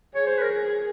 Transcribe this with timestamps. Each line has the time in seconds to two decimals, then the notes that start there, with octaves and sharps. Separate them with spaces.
0.15 G#4 C#5
0.27 C5
0.37 B4
0.43 A#4